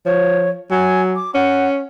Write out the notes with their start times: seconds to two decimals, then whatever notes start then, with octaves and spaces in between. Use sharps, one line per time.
0.06 F3 C#5
0.71 F#3 G#5
1.15 D6
1.35 C#4 F#5